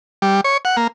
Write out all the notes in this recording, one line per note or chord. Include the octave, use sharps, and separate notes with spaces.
G3
C#5
F#5
A#3